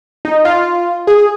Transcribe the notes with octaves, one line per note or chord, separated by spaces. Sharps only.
D#4
F4
G#4